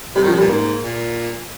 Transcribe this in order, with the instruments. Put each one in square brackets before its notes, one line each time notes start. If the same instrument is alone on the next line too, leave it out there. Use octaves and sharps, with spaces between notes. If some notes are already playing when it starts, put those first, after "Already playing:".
[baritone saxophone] C3 [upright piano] G3
[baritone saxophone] D#3
[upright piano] F3
[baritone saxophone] C3
[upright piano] G3
[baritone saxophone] A#2
[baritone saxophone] G#2 [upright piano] A#3
[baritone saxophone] A#2